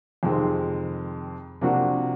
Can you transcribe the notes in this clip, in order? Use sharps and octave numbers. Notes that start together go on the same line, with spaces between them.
F2 C3 D#3 G#3 C4
C3 F3 A#3 D4 F#4